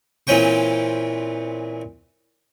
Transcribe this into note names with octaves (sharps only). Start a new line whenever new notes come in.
A#2 E3 C4 C#4 G5 C#6